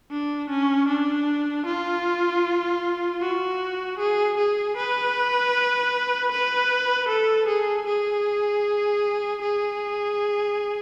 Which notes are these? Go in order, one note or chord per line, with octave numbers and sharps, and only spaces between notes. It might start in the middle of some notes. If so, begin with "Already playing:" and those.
D4
C#4
D4
F4
F#4
G#4
G#4
B4
B4
A4
G#4
G#4
G#4